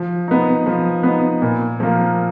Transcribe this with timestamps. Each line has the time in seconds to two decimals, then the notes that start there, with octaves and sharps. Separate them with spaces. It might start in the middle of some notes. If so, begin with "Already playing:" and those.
Already playing: F3
0.28 B3 D#4
0.66 F3
1.03 B3 D#4
1.42 A#2
1.80 F3 A#3